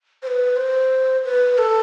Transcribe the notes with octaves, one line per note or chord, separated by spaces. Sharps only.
C5
B4
C5
B4
A4